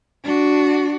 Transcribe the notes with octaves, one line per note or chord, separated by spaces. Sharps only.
D4 F#4